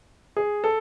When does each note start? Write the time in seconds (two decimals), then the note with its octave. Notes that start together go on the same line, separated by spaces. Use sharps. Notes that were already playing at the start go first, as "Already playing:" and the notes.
0.36 G#4
0.64 A4